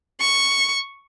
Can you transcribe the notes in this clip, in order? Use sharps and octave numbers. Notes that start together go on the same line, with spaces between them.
C#6